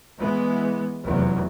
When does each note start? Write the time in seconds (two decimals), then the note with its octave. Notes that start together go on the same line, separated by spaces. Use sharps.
0.18 E3 G#3 B3
1.04 F1 E2 F#3